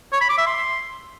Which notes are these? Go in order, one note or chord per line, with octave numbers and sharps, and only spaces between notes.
C#5
B5
D6
E5
C6